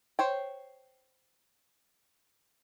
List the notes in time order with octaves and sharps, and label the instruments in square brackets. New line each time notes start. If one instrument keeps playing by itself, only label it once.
[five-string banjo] C5 C#5 G5